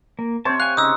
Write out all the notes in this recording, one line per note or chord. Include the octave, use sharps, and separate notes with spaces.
A#3
C3 C4 C5 C#5 A5
F5 G#5 F#6
C#3 C#4 D#4 D#6 E6